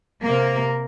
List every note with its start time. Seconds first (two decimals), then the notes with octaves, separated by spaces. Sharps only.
0.23 C3 A#3